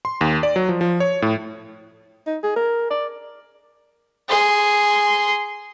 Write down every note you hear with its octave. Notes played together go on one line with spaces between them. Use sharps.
C6
D#2
D5
F#3
F3
F3
C#5
A2
D#4
G#4
A#4
D5
G#4 C6